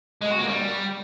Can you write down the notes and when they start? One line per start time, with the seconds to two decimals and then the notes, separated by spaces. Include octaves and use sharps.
0.21 G#3
0.30 F#4
0.39 A#3
0.47 G3